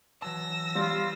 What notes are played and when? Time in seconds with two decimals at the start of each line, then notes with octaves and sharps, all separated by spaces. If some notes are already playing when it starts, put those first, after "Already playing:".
0.22 E3 F#3 A5 E6 A#6
0.75 G3 F4